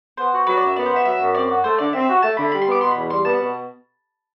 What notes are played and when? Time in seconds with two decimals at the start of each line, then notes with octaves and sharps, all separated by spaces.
0.17 B3 C5
0.33 F#4
0.47 F#3 B4
0.57 D5
0.62 F#2 E5
0.76 B3 D5
0.86 C5
0.91 F#4 E5
1.05 F#3 E5
1.20 F#2
1.34 C4 D5
1.49 F#4
1.64 A3 C5
1.78 D3 D5
1.93 C4 E5
2.08 F#4
2.22 A3 A5
2.37 D3 B5
2.51 G3 B5
2.62 C6
2.67 B3 D6
2.81 B2 C6
2.91 B5
2.95 E2
3.10 G3 C6
3.25 B3 A5
3.39 B2